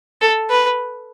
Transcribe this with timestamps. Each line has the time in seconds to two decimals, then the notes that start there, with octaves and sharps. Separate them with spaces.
0.21 A4
0.50 B4